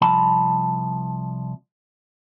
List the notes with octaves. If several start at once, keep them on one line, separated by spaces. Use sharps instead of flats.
C2 F3 A5 B5